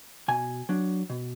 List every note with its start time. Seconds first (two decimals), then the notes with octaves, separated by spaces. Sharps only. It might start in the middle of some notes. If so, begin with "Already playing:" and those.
0.28 B2 G#5
0.69 F#3 D4
1.10 B2